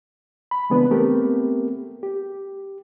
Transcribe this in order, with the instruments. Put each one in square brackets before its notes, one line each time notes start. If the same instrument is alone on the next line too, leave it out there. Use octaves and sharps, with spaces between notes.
[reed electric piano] B5
C#3 E3 G#3 B3 D4 B4
A3 B3 C4 G4 A#4
G4